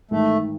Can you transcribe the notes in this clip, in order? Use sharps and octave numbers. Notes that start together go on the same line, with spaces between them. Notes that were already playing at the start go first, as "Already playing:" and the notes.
A1 G#2 D#3 A3